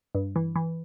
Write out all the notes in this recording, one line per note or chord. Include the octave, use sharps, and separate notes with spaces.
G2
E3
E3